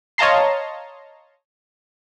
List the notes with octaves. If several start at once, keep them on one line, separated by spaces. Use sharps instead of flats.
C#5 D#5 F5 A5 A#5 C6